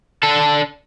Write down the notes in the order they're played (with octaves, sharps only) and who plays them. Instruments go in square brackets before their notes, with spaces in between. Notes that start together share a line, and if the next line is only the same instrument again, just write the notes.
[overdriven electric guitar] D4 A4